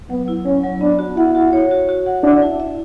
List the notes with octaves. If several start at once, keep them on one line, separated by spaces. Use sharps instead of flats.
F#3 B3
E4
F#3 C#4
F#3
B3 D4
F#4
E4 F#5
F#4
C#5
F#4
F#4
F#5
D4 E5
E4
E5